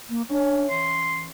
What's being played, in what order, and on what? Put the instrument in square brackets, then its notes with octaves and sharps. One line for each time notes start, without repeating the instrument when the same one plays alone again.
[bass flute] A#3
[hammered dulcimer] C#4 E5 [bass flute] D4
[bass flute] E3 [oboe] C6